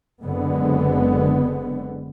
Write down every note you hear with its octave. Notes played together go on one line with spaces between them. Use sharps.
F#1 D3 G#3 B3 C4